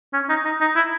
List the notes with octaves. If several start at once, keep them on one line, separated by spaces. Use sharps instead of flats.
C#4
D#4
D#4
D#4
E4